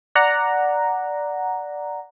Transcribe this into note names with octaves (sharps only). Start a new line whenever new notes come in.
D5 F#5 A#5